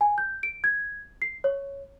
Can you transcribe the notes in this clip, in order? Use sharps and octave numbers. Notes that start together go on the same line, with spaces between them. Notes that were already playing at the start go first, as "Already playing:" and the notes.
G#5
G6
D7
G#6
C7
C#5